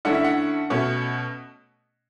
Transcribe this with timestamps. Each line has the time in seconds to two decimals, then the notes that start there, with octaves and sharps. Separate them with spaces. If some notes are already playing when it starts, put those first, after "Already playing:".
0.05 D3 A3 C#4 E4 F#5
0.14 E5
0.24 F#5
0.70 B2 A3 C#4